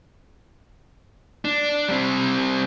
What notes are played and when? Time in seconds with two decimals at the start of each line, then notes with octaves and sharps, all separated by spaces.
1.45 D4
1.88 G3 C4